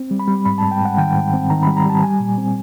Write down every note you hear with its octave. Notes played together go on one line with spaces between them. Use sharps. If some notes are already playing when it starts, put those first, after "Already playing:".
Already playing: C4
G3
B5
G3
G#2 B5
A5
G#2
G5
G#2
F#5
D#3 G5
G#2
C4
D#3 A#5
B5
G3
A#5
G3 A5
G3 G#5
A#2
C4